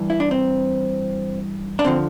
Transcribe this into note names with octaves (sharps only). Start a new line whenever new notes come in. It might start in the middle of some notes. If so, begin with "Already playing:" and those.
Already playing: G2 E3
E4
D4
C4
D4
D3 F3 C4